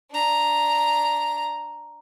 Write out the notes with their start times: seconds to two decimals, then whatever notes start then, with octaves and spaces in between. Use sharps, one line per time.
0.11 D4 A#5